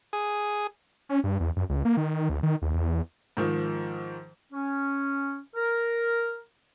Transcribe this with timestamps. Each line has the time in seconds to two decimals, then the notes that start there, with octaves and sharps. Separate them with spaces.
0.13 G#4
1.09 C#4
1.24 G2
1.40 E2
1.56 F#2
1.69 C#2
1.85 A#3
1.97 D#3
2.29 D2
2.43 D#3
2.62 D#2
2.74 E2
3.37 G#2 D#3 F3
4.51 C#4
5.55 A#4